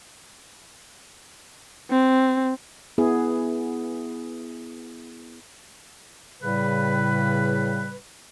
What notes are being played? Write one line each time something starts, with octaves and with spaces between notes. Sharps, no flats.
C4
B3 E4 G#4
A2 C#3 G3 B4